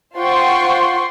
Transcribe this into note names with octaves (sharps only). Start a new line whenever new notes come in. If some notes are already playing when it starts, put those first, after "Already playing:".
F4 C5 F#5 G5 C6 C#6